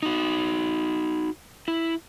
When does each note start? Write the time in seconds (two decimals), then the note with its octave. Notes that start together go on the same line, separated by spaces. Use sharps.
0.03 D#4 F#4
1.68 E4